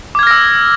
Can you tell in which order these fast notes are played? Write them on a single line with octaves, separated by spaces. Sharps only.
D6 G#6 F6 A#6 E6